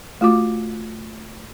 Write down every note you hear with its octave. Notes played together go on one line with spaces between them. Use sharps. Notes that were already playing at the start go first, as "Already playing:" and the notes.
A3 F4 F#4 D6